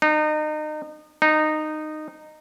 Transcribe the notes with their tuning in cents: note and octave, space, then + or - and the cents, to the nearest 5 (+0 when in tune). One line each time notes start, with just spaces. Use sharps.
D#4 -30
D#4 -15